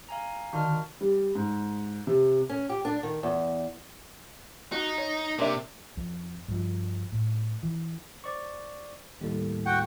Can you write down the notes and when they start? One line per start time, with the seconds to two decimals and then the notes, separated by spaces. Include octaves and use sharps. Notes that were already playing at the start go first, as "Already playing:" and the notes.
0.09 F5 G#5 A#5
0.53 D3 D#3 F#4 F5 A5 C6 F6
1.01 G3
1.35 G#2
2.07 C3
2.50 C#4
2.69 G4
2.85 D4
3.03 D#3
3.23 E2
4.72 D#4 F#4
4.98 C#5
5.39 C3 A#3 D4 E5
5.97 F2
6.48 G2 F3
7.12 A2
7.63 E3
8.24 C5 D5 C#6
9.21 D#2 A2 G3 A4
9.66 F#4 F#5 G5